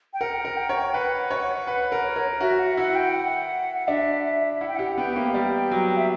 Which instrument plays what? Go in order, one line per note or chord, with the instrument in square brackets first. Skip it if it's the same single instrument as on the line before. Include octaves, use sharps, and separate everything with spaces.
[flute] G5
[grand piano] A#4 [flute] F#5
[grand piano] A#4
[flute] G5
[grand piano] C#5
[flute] G5
[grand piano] B4 [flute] F#5
[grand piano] C#5
[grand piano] B4 [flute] F#5
[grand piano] A#4
[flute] C#5
[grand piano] A#4
[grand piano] F#4 [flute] E5
[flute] F#5
[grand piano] E4 [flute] F#5
[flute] G5
F#5
F#5
[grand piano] D4 [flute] E5
[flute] E5
[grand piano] E4 [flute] F#5
[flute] G5
[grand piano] G4 [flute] F#5
[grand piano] B3 [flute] G5
[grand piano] A#3
[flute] G5
[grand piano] G3
F#3
[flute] E5